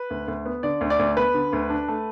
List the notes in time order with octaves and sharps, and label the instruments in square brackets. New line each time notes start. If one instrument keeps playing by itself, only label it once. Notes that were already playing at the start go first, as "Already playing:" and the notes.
Already playing: [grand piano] B4
D2
D2
B3
D3 D5
D2
D5
D2
B3 B4
D3
D2
D4
A3